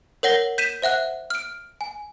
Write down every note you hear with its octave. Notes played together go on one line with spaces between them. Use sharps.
A#4 C#5 F#5 A#6 G7
G6 B6 D#7 E7
C5 E5 F#5 F#6
F6 D7
G#5